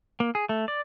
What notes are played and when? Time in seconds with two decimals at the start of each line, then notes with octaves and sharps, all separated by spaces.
0.20 A#3
0.35 G#4
0.49 A3
0.68 D5